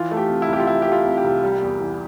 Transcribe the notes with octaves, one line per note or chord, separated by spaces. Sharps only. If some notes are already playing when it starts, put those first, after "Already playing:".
Already playing: E3 F4
A3
G4
C3
E4
C2 G4
F4
E3 E4
A3 G4
F4
C3
G4
C2
G3
E2
E3